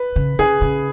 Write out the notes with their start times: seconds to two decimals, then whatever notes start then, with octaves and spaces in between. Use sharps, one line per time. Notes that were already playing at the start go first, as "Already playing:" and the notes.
Already playing: B4
0.16 C#3
0.39 C#3 G#4
0.61 C#3